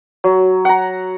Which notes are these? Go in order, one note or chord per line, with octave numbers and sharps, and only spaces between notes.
F#3
F#5 A#5